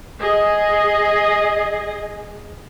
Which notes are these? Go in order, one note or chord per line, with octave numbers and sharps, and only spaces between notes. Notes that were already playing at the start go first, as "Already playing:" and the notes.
G#4 D#5